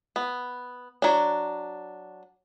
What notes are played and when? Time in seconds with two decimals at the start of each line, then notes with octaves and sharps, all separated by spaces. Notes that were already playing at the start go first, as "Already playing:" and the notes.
0.16 B3
1.02 F#3 D4